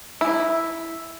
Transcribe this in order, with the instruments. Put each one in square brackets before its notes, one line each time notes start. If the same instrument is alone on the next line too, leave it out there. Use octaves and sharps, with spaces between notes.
[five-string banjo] E4